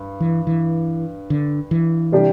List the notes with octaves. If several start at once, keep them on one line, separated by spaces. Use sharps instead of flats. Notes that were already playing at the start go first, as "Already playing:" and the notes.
Already playing: G2
E3
E3
D3
E3
C3 G3 D4 G4